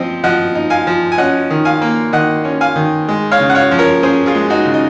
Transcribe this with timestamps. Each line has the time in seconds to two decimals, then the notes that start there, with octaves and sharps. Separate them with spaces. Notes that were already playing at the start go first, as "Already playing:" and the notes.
Already playing: F3 C4 C5 D#5
0.24 F3 D#5 F#5
0.55 D#4
0.70 F5 G#5
0.87 F3
1.12 G#5
1.18 C#4 D#5 F#5
1.50 D#3
1.65 F5 G#5
1.82 A#3
2.12 D#3 D#5 F#5
2.44 C#4
2.61 F5 G#5
2.76 D#3
3.08 G#3
3.32 C#5 F5
3.40 C#3
3.50 F#5
3.55 C#5 F5
3.71 F3
3.79 A#4 C#5
4.03 C#4 G#4 C5
4.26 F4 G#4
4.35 G#3
4.50 D#4 F#4
4.66 C#3
4.74 D#4